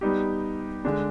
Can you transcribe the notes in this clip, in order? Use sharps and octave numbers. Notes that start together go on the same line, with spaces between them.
G3 B3 D#4 G4
D3 G#3 D4